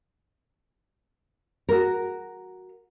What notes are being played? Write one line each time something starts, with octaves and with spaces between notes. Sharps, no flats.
F#4 A#4